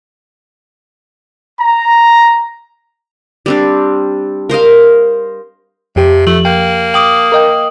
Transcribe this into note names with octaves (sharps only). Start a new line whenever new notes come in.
A#5
G3 C4 D4
A#4 C5 D#5 F5
F2 C3 G4
F3 A3 F#7
A#3 G5
G5 D6 D#6 F#7
A#4 D#5 G5